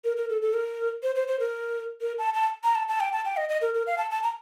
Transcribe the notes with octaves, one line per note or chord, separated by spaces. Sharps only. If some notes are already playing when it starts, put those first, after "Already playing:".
A#4
A#4
A4
A4
A#4
C5
C5
C5
A#4
A#4
A5
A5
A#5
A5
A5
G5
A5
G5
D#5
D#5
A#4
A#4
F5
A5
A5
A#5